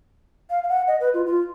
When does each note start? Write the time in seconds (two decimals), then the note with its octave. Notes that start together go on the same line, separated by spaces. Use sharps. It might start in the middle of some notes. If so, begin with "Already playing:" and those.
0.50 F5
0.64 F5
0.68 F#5
0.88 D#5
1.00 B4
1.14 F4
1.26 F4